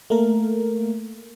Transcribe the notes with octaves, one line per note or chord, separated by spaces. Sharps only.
A3 A#3 A#4